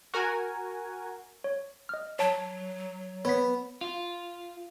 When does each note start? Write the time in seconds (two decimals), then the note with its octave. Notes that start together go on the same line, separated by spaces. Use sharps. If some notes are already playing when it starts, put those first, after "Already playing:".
0.14 F#4 A#4 G#5
1.44 C#5
1.89 D#5 F6
2.19 F#3 C#5 A5
3.25 B3 C#5 B6
3.81 F4